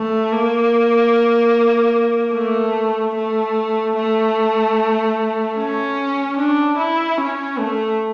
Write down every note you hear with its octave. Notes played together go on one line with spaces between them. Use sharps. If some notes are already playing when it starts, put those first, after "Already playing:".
Already playing: A3
A#3
A3
A3
A3
C#4
D4
E4
C#4
A3